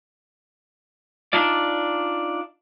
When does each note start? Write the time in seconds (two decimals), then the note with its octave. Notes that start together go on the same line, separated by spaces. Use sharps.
1.33 D4 D#4 F4 D5